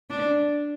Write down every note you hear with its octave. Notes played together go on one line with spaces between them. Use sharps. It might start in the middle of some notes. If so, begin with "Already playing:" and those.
D4